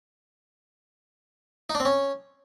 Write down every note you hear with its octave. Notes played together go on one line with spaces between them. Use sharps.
D#4
D4
C4
C#4